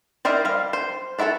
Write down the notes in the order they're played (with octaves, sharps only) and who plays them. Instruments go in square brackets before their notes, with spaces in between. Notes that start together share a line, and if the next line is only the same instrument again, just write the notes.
[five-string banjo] D#4 E4 A#4 C5 D5
G3 F5
C5
D4 E4 F#4 A4 C#5